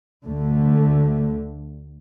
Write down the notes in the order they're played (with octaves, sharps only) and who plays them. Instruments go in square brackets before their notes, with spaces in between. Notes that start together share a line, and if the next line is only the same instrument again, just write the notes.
[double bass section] D2 D3 A3